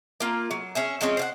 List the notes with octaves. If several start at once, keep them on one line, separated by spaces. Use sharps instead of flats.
A#3 F4
F#3
C#4 G#4 E5
F3 G#3 C4 C#4
C5 F5 F#5